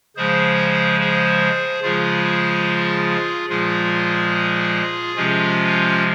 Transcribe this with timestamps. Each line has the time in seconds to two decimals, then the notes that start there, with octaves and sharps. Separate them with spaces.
0.16 C#3 F3 G#3 G#4 C5
1.00 G#4 C5
1.83 C#3 F3 G#3 F4 G#4
3.49 A#2 F3 G#3 F4 G#4
5.16 C3 F3 G#3 C#4 F4